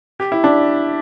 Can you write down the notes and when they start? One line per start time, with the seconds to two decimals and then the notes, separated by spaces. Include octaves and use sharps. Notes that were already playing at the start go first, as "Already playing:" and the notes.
0.20 G4
0.32 E4
0.44 D4